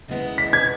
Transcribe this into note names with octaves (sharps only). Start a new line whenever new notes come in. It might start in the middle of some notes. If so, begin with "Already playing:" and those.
D#2 C#3 G#3 B3 E4
B6
G#6